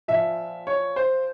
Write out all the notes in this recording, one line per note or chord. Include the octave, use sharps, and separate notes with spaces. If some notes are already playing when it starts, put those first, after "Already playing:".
A#2 F3 E5
C#5
C5